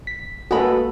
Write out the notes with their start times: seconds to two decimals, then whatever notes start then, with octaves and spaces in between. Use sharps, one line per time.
0.07 B6
0.51 G#3 A#3 F#4 A4 B4 B5